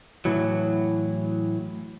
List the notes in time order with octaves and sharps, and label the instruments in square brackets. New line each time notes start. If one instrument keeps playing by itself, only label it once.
[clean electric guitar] A2 E3 F#3